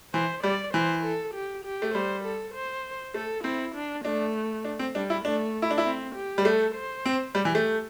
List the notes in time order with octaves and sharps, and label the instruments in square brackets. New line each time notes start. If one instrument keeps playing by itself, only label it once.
[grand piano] E3 [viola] C5
[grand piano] G3 [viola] D5
[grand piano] E3 [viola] C5
[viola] A4
G4
G4
[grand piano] A3
[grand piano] G3 [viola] C5
[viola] A4
C5
[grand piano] A3 [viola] A4
[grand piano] C4 [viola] E4
[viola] D4
[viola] A3 [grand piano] D4
[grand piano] D4
C4
[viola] G3 [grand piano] D4
[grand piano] E4
[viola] A3 [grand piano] D4
[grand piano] E4
D4
E4
[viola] C4
G4
[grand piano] G3
[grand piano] A3 [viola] A4
[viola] C5
[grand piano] C4
[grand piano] G3 [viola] G4
[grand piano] E3
A3